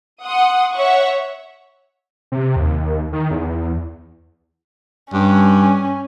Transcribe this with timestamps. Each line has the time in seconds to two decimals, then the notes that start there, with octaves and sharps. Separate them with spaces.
0.24 F#5 C6 D#6
0.74 C#5 E5 F#5 C#6
2.32 C3
2.56 D#2
3.13 D#3
3.31 E2
5.13 G2 C#4